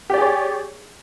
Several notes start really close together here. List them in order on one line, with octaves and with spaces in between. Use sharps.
G4 D5 G#4 C#5